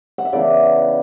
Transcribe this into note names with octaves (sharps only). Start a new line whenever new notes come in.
F#5
E5
C#3 E3 B3 D4 D5